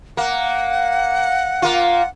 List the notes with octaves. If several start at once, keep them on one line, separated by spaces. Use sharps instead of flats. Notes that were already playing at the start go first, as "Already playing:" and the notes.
A#3 F#5
A#3 F4